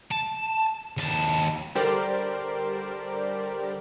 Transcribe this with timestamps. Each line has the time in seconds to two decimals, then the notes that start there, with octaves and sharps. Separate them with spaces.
0.11 A5
0.97 D#2 A5
1.75 D3 G3 G4 A#4 C5 D5